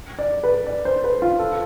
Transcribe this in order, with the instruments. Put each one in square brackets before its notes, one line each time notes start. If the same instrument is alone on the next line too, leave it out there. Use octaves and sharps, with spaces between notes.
[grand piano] D5
B4
D5
C5
B4
F4
A4